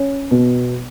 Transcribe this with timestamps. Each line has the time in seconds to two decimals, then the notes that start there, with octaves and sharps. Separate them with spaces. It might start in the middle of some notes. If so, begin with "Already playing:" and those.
Already playing: C#4
0.31 B2